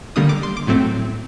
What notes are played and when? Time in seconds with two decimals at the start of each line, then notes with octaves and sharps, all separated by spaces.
0.16 D3 G3 A#3 D4 D#6
0.29 D6
0.43 C6
0.57 D6
0.67 A2 F#3 A3 C4